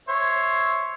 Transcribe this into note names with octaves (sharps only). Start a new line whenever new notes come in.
C5 C#5 E5